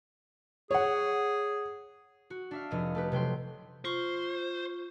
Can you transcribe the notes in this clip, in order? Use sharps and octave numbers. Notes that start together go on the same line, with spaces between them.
G#4 C#5 F#5
F#4
D4 E5 F5
F1 D#5
A3 G4 B4
C3 F#3 G5 C6
F4 C5 C#6